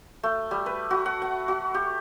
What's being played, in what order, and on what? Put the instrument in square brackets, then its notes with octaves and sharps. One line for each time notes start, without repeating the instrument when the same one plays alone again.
[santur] A3
G3
B4
F#4
F#5
F#5
F#4
G4